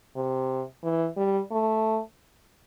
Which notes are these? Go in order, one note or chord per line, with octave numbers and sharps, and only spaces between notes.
C3
E3
G3
A3